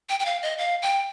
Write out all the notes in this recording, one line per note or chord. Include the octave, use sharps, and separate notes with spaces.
G5
G5
F5
D#5
F5
G5